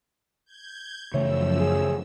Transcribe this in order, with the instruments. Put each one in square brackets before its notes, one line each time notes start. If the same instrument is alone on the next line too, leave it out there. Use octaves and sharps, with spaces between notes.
[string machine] G6 G#6
[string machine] F#2 F3 E6 [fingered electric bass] C#3 E3 A3 [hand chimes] C#5 E5
[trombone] G#4